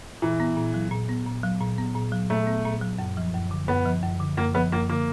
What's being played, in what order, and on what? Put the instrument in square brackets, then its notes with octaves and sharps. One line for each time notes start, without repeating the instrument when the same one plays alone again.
[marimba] A#2 [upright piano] E3
[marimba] B3
A#2
F#3
A#2
B3
A#2
F#3
A#2
B3
A#2
F#3
[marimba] A#2 [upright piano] A3
[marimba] B3
A#2
F#3
F#2
F3
F#2
D3
[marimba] F#2 [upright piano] B3
[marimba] F3
F#2
D3
[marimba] F#2 [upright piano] A#3
[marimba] F3 [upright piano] B3
[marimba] F#2 [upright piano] A#3
[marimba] D3 [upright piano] A#3